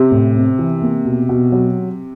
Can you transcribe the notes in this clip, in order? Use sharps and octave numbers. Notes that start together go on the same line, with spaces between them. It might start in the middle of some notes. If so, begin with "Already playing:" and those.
Already playing: C3
A2
C4
E3
A#3
B2
B2
F#3